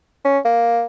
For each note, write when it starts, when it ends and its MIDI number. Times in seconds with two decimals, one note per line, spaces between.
0.25 0.39 61
0.45 0.85 58